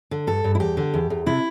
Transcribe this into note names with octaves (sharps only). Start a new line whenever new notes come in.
D3
G2 A4
G2
E4
E2 G4
D3
E2
E2
C3 E4